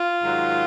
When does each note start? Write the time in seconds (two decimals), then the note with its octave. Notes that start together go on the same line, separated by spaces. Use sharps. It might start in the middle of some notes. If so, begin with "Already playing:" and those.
Already playing: F4
0.22 G#2 D#3 F#3